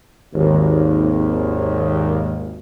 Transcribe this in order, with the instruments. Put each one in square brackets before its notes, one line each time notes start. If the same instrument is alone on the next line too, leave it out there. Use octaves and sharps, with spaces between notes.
[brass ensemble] G#1 D#2